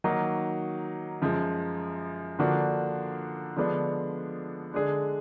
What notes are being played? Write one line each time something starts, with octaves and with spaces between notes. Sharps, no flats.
D#3 F#3 A#3 D#4 F#4
F#2 F3 G#3
D3 F3 A#3 D4 F#4
D3 F3 G#3 B3 D4
D3 G#3 D4 G#4